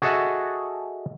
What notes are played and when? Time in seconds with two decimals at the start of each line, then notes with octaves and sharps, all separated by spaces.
0.02 F#4 G#4 A4 D#5 E5 F#5